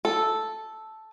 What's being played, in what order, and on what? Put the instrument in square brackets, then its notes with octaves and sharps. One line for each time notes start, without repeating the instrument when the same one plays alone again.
[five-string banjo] A4